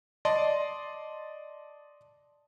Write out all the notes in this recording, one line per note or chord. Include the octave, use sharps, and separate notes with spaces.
D5 D#5 A5 C6